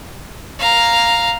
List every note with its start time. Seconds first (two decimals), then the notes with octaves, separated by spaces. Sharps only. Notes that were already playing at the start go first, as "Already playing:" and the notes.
0.59 F5 A#5